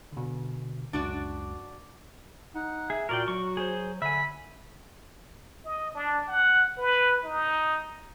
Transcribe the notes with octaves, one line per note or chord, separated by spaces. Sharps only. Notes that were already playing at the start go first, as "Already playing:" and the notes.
B2 D3
C#2 F#2 D4 F#4 D5
D#4 F#5
G#4 E5
A#2 F#4 A#4 D5 G5
F#3 C#6
G#4 C5
D3 E5 G#5 B5
D#5
D4
F#5
B4
D#4